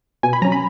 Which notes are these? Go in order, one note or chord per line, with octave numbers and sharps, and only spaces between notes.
B2 G#5
B5
F#3 C#4 A#5
B5